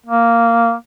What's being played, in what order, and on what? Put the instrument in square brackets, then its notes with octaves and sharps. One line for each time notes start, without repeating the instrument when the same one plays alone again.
[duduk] A#3